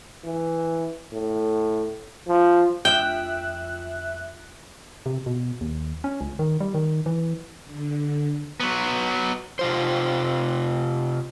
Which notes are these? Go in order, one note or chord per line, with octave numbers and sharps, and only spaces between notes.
E3
A2
F3
F2 E5 G5 F#6
C3
B2
D#2
C#4
C#2
D#3
G3
D#3
E3
D3
F#3 B3
C3 F4 C5